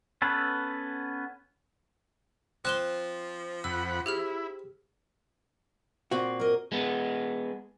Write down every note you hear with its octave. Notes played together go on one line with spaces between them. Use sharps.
B3 C#4 A4 B4
F3 C4 F#6 E7 G7
F2 F#5 B5 E6
E4 G4 G#4 F6
A#2 C4 F#4
A#4 D#5
G#3 B3